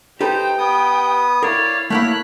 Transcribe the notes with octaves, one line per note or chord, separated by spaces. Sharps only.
D#4 G4 A4 B4 C5 G5
B3 D#6
E4 A#4 C#5 D5 F5
A3 A#3 E4 C#5 F#6 B6